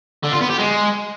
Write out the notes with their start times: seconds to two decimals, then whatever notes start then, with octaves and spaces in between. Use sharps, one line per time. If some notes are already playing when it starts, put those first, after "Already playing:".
0.24 D3
0.32 F4
0.41 B3
0.50 G4
0.59 G#3